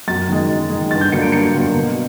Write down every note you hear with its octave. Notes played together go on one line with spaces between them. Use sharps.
F#2 A6
D#3 G#3
F#2
D#3 G#3
G2 A6
G6
D3 F#3 A#3 C#7
D7
G2 C#7
D3 F#3 A#3
B2